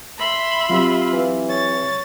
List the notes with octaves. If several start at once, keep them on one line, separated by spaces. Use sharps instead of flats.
E5 B5 C6
F#3 C4 F4 G4
E3
C#5 A6